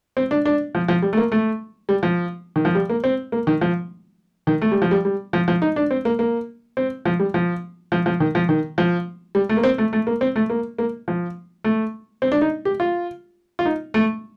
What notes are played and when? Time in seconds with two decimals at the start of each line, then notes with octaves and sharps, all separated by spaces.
0.17 C4
0.31 D4
0.45 D4
0.75 F3
0.88 F3
1.02 G3
1.13 A3
1.17 A#3
1.32 A3
1.89 G3
2.03 F3
2.56 D#3
2.65 F3
2.75 G3
2.90 A#3
3.04 C4
3.32 A#3
3.47 D#3
3.61 F3
4.47 D#3
4.62 A3
4.72 G3
4.82 F3
4.91 G3
5.05 G3
5.33 F3
5.48 F3
5.62 D#4
5.76 D4
5.91 C4
6.05 A#3
6.19 A#3
6.77 C4
7.05 F3
7.20 G3
7.34 F3
7.92 F3
8.06 F3
8.20 D#3
8.35 F3
8.49 D#3
8.78 F3
9.35 G3
9.49 A3
9.57 A#3
9.63 C4
9.78 A3
9.93 A3
10.07 A#3
10.21 C4
10.36 A3
10.50 A#3
10.78 A#3
11.08 F3
11.64 A3
12.22 C4
12.32 D4
12.41 D#4
12.65 G4
12.80 F4
13.59 F4
13.65 D#4
13.94 A3